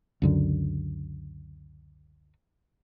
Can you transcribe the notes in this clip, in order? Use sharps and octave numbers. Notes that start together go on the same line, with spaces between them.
C#2 F#2 D3